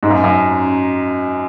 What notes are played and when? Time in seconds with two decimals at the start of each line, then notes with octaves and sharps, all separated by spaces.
0.03 G#2
0.10 F#2
0.24 F#2